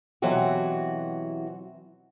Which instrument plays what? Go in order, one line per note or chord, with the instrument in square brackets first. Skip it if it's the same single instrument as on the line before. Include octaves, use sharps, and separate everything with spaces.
[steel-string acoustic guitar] B2 E3 F#3 C4 F#4 G4